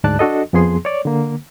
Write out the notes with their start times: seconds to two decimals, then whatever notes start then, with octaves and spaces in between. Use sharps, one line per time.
0.04 D2 G#2 D5 A5 F#6
0.19 D4 F#4 A4 D#5
0.53 F2 F3 B3 G#4 C6
0.85 C#5 D5
1.05 D3 A#3